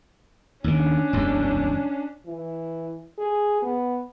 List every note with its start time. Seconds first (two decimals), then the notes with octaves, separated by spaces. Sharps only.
0.64 D#2 D#3 C#4 D4
1.13 E1 C2 F#2
2.26 E3
3.19 G#4
3.62 B3